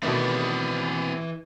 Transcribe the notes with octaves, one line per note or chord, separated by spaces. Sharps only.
B2 D#3 E3 A3 C4 B4 D5